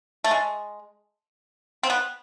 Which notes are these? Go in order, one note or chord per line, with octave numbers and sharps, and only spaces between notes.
A3
G#3
C4
B3